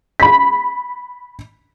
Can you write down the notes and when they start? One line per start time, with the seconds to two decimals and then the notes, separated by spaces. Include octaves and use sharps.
0.20 B5 B6